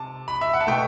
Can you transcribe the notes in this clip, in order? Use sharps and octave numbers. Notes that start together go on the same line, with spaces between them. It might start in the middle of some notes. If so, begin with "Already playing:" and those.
Already playing: C3 A5
B5
E5
F#5
A5
B2 A3 G5